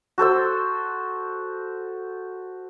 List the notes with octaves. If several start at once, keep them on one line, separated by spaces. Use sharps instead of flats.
F#4 A4 C5 E6